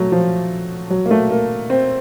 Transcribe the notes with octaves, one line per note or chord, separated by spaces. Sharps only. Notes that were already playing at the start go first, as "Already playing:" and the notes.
Already playing: F#3 A3
F3
F#3
A#3
A3
A#3
C4